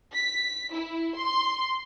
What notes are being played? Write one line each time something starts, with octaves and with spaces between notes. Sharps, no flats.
B6
E4
C6